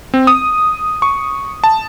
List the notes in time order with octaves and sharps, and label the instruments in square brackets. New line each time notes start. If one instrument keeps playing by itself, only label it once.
[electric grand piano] C4
D#6
C#6
A5